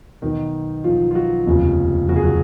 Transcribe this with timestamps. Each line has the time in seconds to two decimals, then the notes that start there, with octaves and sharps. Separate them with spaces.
0.22 B1 B2 D#3 F#3 D#4
0.84 B1 B2 F3 F#3 F4
1.11 F4
1.15 F#3 F#4
1.47 F1 D#2 C#3 F3
2.08 F1 D#2 C#3 F3 F#4
2.16 G#4
2.23 F#3 F#4